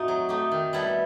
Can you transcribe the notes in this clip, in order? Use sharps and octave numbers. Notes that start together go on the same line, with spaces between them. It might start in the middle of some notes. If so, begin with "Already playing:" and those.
Already playing: A2 A3 C4 D#4 F#4
F#3
A3 D#4 G4
D#3
G3 B3 E4 A4